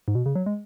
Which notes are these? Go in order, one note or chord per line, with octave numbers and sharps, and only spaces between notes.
G#2
B2
C#3
F#3
G#3